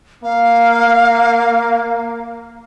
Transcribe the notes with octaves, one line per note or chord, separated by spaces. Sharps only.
A#3 F5